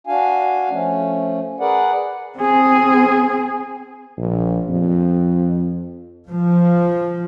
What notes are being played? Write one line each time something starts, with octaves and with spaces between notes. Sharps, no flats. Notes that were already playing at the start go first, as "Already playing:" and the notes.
D4 F#4 F5 G#5
F3 A3 C#4
G#4 A#4 B4 D5 F#5
C4 G#4
A#1
F2
F3